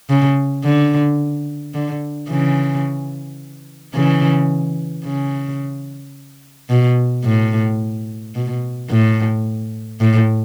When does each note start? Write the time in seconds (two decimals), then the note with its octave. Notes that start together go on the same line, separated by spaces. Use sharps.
0.09 C#3
0.64 D3
1.74 D3
2.29 C#3 E3
3.94 C#3 E3
5.04 C#3
6.70 B2
7.25 A2
8.35 B2
8.90 A2
10.00 A2